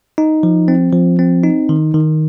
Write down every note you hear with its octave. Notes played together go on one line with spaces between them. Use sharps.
D#4
F3
C4
F3
C4
D#4
D#3
D#3